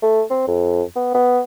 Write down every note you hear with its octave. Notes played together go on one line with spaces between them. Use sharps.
A3
C4
F2
B3
B3